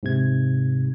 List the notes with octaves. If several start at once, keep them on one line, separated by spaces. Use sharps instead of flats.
G#2 C3 G#6